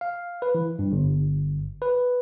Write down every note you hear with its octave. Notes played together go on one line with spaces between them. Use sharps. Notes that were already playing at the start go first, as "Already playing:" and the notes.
F5
B4
E3
G2
G1
B4